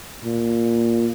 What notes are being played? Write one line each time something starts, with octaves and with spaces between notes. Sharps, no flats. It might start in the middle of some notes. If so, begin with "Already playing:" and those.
A#2